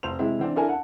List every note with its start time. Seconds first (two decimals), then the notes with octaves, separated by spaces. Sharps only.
0.03 F1 C5 F7
0.19 C3 G#3 C4 E4
0.39 E3 C4 D4
0.55 D4 E4 A4 A#4 G#5
0.69 F#5 A5